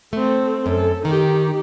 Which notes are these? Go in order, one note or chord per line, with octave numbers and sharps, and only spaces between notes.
A3 C4 A4
F#2 A4
D#3 D#4 G4